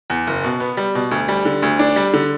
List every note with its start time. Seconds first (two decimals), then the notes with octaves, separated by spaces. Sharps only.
0.10 E2
0.27 F#1
0.44 B2
0.60 B3
0.77 G3
0.95 B2
1.11 D2
1.28 G3
1.45 D3
1.62 D2
1.79 D4
1.96 G3
2.13 D3